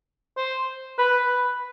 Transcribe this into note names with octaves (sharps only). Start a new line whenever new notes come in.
C5
B4